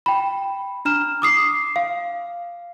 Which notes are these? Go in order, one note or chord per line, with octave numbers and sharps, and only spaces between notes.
G5 B5
D4 A#5 F6 E7
D6 D#6 C7
F5